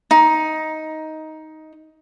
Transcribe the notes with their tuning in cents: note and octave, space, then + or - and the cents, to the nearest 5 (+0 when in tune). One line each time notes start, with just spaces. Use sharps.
D#4 +10